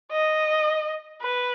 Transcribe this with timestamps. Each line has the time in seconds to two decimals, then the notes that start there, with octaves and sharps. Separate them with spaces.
0.12 D#5
1.21 B4